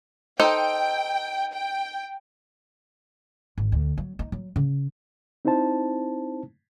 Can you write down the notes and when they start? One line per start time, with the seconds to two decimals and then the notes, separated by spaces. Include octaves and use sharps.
0.40 D#4 A4 C5 G5
1.53 G5
3.58 G#1
3.72 D2
3.98 F#3
4.19 D#4
4.32 F#3
4.56 C#3
5.45 C4 D#4 E4 C5 A5